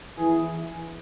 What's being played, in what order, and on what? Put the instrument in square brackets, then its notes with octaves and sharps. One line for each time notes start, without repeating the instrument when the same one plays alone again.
[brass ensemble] E3 B3 E4 G#4